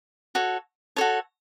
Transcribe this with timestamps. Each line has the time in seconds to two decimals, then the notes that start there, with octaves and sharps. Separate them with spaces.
0.35 F#4 A4 C#5
0.96 F#4 A4 C#5 A5